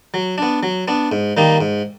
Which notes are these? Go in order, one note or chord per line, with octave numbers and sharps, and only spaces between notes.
F#3
B3 D4
F#3
B3 D4
G#2
D#3 G3 A#3 D#4
G#2